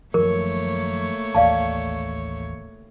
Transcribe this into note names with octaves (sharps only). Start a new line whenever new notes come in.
F#2 D#3 F3 A3 A#3 A#4 C#5
A1 D#2 D5 F5 A5